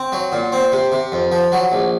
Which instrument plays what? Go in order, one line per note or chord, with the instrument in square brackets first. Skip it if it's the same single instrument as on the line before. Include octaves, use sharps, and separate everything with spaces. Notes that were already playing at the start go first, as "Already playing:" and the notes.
Already playing: [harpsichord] C4
F#3
A#2
C4
C3
C3
F2
F3
F#3
A#1